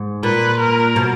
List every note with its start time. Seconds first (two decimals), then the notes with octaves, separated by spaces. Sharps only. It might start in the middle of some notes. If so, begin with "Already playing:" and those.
Already playing: G#2
0.23 A#2 B4
0.60 A#4
0.96 B2